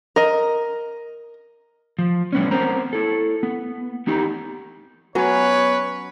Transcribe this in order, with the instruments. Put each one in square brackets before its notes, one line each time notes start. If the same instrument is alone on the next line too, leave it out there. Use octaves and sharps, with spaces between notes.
[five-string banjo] A#4 D#5
[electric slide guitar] F3
G3 B3 C#4
B3 C4 A#4 C5 A#5
E4 A4
B3
B3 D#4 G4
[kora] F#3 C#4 [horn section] B3 B4 C#5